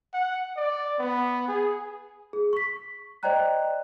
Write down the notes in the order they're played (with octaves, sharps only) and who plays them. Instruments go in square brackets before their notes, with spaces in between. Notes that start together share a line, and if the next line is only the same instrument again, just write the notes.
[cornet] F#5
D5
B3
G#4
[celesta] G#4
C#6 B6
C5 D5 D#5 G5 A#5 F#6